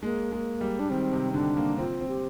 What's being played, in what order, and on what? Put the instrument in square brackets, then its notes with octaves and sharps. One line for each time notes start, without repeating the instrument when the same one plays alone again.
[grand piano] G#3 [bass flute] A#3
[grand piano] G#3
G3
[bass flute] D4
[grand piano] D#3 [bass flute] C4
[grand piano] C3
[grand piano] D3 [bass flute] D4
[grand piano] A#3
[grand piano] C4 [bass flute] F4
[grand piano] C4
[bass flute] G4